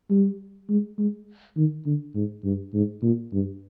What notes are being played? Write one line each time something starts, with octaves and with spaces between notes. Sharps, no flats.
G3
G#3
G#3
D#3
D3
G#2
G2
G#2
A#2
G2